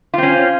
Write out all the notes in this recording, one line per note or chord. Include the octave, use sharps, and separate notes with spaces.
C4 C#4 F4